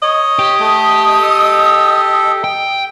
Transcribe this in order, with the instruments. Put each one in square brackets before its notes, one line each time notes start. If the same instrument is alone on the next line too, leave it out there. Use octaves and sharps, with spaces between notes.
[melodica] C#5 [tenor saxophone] D#5
[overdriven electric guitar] G4
[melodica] A3 [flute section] D#6
[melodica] A4
[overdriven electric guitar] G5